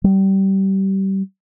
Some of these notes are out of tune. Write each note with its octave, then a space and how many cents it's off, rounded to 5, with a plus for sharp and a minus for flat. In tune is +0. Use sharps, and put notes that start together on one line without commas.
G3 -25